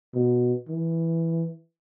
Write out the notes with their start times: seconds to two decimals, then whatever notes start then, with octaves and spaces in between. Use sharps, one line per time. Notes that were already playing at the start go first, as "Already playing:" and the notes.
0.14 B2
0.69 E3